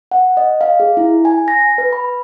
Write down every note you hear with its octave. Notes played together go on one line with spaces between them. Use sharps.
F#5
D#5
F5
G#4
E4
G#5
A#6
B4
B5